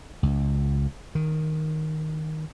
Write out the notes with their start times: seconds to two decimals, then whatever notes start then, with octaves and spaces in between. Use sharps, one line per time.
0.23 C#2
1.15 D#3